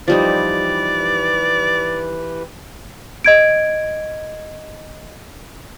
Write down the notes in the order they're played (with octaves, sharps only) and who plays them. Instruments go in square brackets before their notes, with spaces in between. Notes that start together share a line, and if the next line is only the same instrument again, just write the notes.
[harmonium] E3 G4 B4 [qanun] F3 G3 D#4 [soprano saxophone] D5
[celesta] D#5 G#6 D7